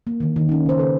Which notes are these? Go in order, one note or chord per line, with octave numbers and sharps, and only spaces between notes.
A#3
D3 D#3
D#3
C#4 D#4
C#3 C5
C#3 A4 B4